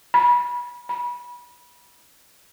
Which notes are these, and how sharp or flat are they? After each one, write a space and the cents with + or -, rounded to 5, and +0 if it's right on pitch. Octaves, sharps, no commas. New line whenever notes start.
B5 -25
B5 -25